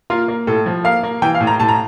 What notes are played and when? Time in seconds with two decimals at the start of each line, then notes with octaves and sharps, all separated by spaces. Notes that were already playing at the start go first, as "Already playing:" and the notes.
0.10 A#3 F4
0.28 A#3
0.47 A2 A4
0.66 F3
0.84 A#3 F5
1.03 A#3
1.22 E3 G5
1.35 F5
1.41 A2
1.47 A#5
1.60 A2 A5
1.68 A#5